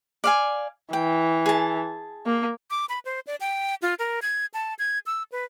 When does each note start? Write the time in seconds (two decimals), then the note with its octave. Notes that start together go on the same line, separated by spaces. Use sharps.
0.24 D5 F5 G#5
0.93 E3 G5
1.46 G#4 A5
2.26 A#3
2.70 D6
2.89 B5
3.05 C5
3.27 D5
3.40 G5
3.82 F4
3.99 A#4
4.22 G#6
4.54 A5
4.79 G#6
5.06 E6
5.32 B4